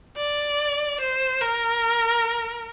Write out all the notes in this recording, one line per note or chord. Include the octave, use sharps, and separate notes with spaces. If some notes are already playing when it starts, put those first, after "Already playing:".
D5
C5
A#4